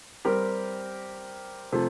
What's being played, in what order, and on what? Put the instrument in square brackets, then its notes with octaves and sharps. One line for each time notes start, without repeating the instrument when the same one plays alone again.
[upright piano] G3 C4 G4 A#4
C3 F3 A3